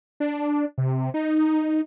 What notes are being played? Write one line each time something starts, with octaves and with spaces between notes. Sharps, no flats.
D4
C3
D#4